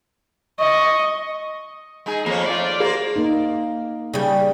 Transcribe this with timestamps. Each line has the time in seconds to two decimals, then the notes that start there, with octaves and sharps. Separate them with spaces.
0.59 D#5 C#6
2.06 G#3 D#4 G#4
2.26 F2 A#3 C#5
2.46 A3 F4 D5
2.80 A#3 G#4 C5
3.16 A#3 D#4
4.14 C#3 G3